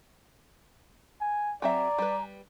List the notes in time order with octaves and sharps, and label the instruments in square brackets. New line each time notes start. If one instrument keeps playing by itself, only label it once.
[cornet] G#5
[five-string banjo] F#3 C4 E5 [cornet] D5 [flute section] G#5 A#5
[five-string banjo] G3 B4